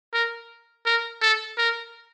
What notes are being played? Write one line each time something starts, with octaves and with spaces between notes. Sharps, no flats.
A#4
A#4
A4
A#4